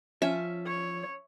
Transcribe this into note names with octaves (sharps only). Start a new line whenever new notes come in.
F3 C#4 E5
C#5